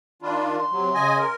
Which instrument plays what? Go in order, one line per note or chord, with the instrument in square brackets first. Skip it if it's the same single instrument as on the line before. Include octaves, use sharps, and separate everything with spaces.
[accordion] D#3 D4 F4 [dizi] B5
[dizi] C6
[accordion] C3 F#3
C#3 D#5 G#5
A#4